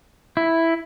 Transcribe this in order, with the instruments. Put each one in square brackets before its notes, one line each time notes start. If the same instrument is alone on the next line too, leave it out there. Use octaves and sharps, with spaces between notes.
[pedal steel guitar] E4